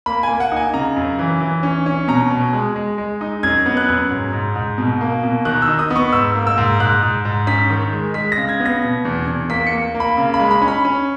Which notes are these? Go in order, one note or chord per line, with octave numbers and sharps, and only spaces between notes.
A#3 B5
G#5
A#3
F#5
D#4
G#5
C#3 A#5
F#2
E3
E3
C#4
C#4
B2 A#5
B2
G#3
G#3
G#3
D#4
F#2 G#6
B3
F#6
F#2
G#2
G#2
G#2
B2
A#3
B2
D#3 F#6
E6
D#4
D#6
B3
C#6
G#2 E6
A#3
E6
G#2
G#2 F#6
G#2
G#2
C#4 B6
D#3
G#3
G#3 B6
A#6
C#3
G#6
B3
A#6
B2
E2
E2
A#3 B6
C#7
A#3
A#3
B5
C#3
B5
G#3
B5
C#4
B5
C#4